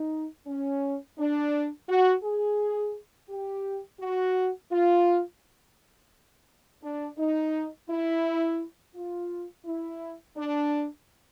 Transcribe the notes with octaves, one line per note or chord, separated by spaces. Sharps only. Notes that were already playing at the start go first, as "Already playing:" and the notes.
Already playing: D#4
C#4
D4
F#4
G#4
G4
F#4
F4
D4
D#4
E4
F4
E4
D4